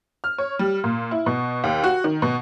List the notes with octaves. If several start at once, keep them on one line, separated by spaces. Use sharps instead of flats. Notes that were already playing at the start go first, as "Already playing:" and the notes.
F6
C#5
G3
A#2
E4
B2
D#2
F#4
D#3
B2